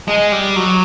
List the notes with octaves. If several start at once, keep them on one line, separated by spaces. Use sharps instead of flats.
G#3
G3
F#3